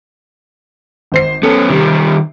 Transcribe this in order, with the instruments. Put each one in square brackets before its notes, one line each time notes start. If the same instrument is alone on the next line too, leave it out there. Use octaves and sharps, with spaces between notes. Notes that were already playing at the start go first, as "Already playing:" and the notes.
[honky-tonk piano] G#1 C5 C7
[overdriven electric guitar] B3 C#4 [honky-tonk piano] A4
[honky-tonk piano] C3 [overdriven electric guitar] D#3 G3